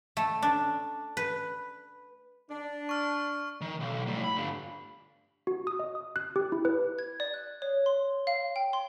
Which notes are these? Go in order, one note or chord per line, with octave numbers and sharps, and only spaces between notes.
A3
D4
B4
D4
C#6 F6
D#3
B1
A2 G3
B5
G2 D3
F#4
D#6
D#5
D#6
F#6
G4
E4
B4
G#6
D5
F#6
C#5
C6
F5
G5
C6